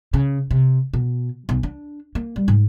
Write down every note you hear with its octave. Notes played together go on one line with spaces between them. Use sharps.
C#3
C3
B2
B1
D4
A#3
G3
G#2